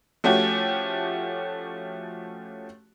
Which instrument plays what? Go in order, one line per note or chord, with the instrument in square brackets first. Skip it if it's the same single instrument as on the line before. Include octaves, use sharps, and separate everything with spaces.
[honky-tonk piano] F3 A3 C#4 F#4 G4